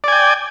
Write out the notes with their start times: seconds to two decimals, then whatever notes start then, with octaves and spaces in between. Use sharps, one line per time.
0.04 D5
0.08 G#5
0.12 G5